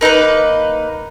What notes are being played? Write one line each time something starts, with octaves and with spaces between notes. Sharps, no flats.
A#3 D#4 A#4 B4